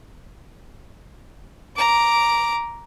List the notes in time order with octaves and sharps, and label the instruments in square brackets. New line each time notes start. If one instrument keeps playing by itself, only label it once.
[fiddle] A#5 D6